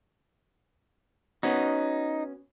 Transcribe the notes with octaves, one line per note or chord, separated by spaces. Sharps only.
B3 C#4 D#4 F#4